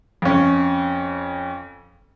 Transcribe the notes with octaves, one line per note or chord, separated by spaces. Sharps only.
F2 C#4